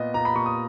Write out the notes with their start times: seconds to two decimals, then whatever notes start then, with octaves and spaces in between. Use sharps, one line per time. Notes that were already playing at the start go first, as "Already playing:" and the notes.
Already playing: A#2 B3 D#5
0.14 A#2 A#5
0.25 B5
0.35 A#2 C#6
0.46 D#6